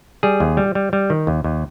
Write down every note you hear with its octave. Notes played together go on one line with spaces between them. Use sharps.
G3 G#4
D#2
G3
G3
G3
D#3
D#2
D#2